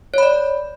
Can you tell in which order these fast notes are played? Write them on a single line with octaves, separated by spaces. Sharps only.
C#5 B5 D5